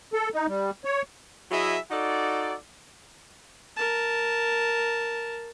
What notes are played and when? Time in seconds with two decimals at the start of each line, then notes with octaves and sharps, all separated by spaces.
0.13 A4
0.34 D#4
0.48 G3
0.85 C#5
1.51 F#3 E4 G#4 D#5 E5
1.91 D#4 F#4 A4 D5
3.77 A#4 A5